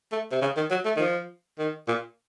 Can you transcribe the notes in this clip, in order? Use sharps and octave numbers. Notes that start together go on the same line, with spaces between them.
A3
C3
C#3
D#3
F#3
A3
D#3
F3
D#3
A#2